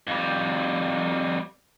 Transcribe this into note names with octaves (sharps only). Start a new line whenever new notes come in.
F2 G3